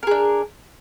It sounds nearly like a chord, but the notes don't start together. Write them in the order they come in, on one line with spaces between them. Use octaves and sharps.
A#4 G#4 D4